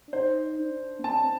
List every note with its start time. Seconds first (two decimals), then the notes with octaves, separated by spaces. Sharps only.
0.08 D4
0.13 D#4 C5
0.59 D4
0.99 A#3
1.04 C4 A5
1.21 C4